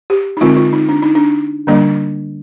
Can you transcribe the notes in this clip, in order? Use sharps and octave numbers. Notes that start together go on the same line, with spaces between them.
G4
D#4
D3 G#3 C4 F4
F4
D#4
D4
D#4
D4
D3 G3 A#3 D4